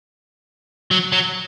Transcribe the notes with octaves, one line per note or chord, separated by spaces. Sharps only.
F#3
F#3